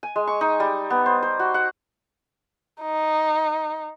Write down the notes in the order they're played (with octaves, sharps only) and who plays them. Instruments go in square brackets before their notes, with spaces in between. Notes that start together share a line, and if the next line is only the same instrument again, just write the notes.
[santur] G#5
G#3
C#6
D#4
G3
B3
C5
C5
F#4
F#5
[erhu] D#4